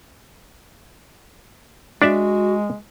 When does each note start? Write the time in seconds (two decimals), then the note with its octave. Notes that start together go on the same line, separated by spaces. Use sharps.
2.02 G#3 D4 F#4 D5 E5